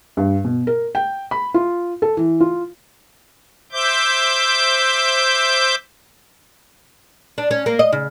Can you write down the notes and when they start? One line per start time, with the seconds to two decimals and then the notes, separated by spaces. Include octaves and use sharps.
0.17 G2
0.44 B2
0.67 A#4
0.95 G5
1.31 B5
1.54 F4
2.02 A4
2.17 E3
2.40 F4
3.72 C5 E5 D6 G6
7.38 D4
7.51 C#4
7.66 A#3
7.79 D#5
7.92 C#3